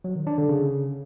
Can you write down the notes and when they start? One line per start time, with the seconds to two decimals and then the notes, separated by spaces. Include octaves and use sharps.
0.04 F#3
0.16 D#3
0.27 D4
0.38 D3
0.49 C#3